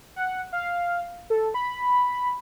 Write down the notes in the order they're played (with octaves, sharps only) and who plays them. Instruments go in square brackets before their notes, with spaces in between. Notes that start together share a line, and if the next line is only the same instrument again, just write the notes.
[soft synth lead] F#5
F5
A4
B5